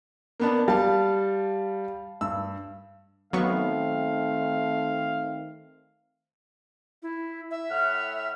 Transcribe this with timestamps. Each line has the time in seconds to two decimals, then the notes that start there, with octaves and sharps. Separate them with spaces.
0.40 A#3 B3 D4
0.68 G3 F5 A5
2.21 G2 E6
3.33 D#3 F#3 A3 B3 C4 F5 C#6
7.03 E4
7.51 E5
7.71 A2 F#5 F6